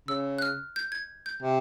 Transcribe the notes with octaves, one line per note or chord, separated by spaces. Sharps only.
C#3 E6
F#6
F6
G6
G#6
G6
C3